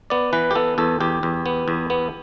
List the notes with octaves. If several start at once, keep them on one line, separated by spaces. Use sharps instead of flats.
B3 D5
E3 B4
G4
B3 A4
E2 A4
E2 G4
E2
B3
E2
B3